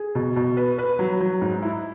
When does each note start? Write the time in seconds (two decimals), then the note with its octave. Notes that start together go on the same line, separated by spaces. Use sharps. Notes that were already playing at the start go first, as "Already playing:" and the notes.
Already playing: G#4
0.15 B2
0.36 B2
0.57 B4
0.78 B4
0.99 F#3
1.20 F#3
1.42 G#2
1.62 E4